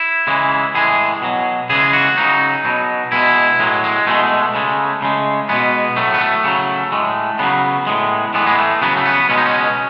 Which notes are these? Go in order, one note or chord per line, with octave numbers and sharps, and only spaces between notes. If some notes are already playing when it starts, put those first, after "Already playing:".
Already playing: E4
C#3 E3 G#3
A2 E3 G#3 G#4
B2 F#3
C#3 E3 G#3 G#4
F#4
C#3 F#3 D#4
B2 F#3
B2 G#3 E4
A2 F#3 G#3
G#3
B2 G#3 A3
C#3 G#3
C#3 G#3
B2 G#3 B3
A2 F#3 A3
B3
A3
C#3 F#3
A2 G#3
C#3 F#3 B3
A2 G#3
A2 E3 G#3 B3
G#3
A3
C#3 F#3 B3
A3
B3
B2 G#3 C#4
D#4
C#4